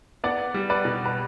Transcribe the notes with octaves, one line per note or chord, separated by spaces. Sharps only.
B3 D5 F#5
G3
B4 D5
B2
B4